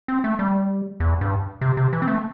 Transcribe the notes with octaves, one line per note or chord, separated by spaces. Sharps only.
C4
A3
G3
E2
G2
C3
C3
E3
C4
A3